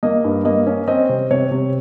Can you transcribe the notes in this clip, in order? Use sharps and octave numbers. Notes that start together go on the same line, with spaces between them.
A#3 D#5
G2
A#3 D#5
C#4
C4 D#5
C3
C3 C#5
C3